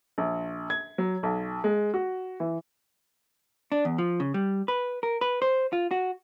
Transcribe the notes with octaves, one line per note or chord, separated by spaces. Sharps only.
A#1
G#6
F#3
B1
G#3
F#4
E3
D4
E2
F3
C#3
G3
B4
A#4
B4
C5
F4
F#4